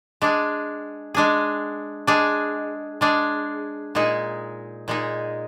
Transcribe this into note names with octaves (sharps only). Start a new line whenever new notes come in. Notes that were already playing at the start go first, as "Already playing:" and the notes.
G#3 D4 G#4
G#3 D4 G#4
G#3 D4 G#4
G#3 D4 G#4
A#2 G#3 D#4 G#4
A#2 G#3 D#4 G#4